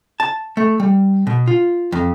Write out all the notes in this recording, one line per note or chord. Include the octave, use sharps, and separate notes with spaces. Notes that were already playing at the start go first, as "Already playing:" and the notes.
A5
A3
G3
B2
F4
F2